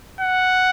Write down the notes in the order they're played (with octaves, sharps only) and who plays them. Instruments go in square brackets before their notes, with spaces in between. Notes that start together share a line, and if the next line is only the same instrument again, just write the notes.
[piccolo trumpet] F#5